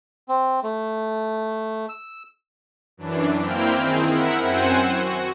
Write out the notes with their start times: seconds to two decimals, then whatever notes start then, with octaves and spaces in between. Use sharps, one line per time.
0.29 C4
0.63 A3
1.89 E6
2.97 F#2 E3 D4
3.39 A#3 C4 E4 G5 F6
3.76 D#3 C4 G#4
4.09 E4 A#4 E5 F#5
4.42 F#2 C4 C5 F#5 G#5 E7
4.89 F#4